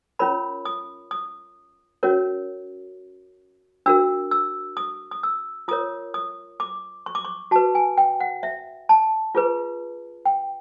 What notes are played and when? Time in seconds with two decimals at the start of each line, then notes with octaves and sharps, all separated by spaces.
0.19 C#4 F4 A#4 C#5 B5
0.65 D#6
1.11 D#6
2.03 C#4 F#4 A#4 C#5
3.86 D4 F#4 A#4 E6
4.31 E6
4.77 D#6
5.11 D#6
5.23 E6
5.68 F4 A#4 C#5 D#6
6.14 D#6
6.60 D6
7.06 C#6
7.15 D6
7.25 C#6
7.51 F#4 B4 A5
7.75 G#5
7.98 G5
8.20 F#5
8.43 E5
8.89 A5
9.35 F4 G#4 B4
10.26 G5